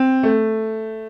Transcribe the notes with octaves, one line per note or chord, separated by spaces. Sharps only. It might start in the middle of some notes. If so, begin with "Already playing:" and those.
Already playing: C4
A3